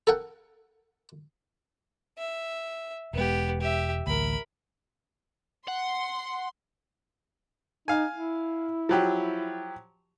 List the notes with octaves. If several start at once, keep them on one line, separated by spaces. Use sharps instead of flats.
A4 A#4 F#5 G5
E5
E1 G#3 B3 G4
G4 E5
A1 D2 A#4 B5
F#5 C6
D#4 F5 G#5
E4
F3 F#3 G4